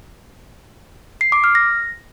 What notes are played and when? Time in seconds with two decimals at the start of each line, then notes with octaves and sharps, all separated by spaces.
1.21 C7
1.32 D6
1.44 F6
1.55 A#6